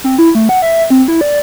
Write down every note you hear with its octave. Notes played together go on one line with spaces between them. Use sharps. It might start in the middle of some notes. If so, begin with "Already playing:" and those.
C4
E4
A3
F#5
E5
C4
E4
D5